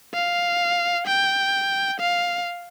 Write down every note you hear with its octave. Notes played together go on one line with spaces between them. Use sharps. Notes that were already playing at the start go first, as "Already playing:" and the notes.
F5
G5
F5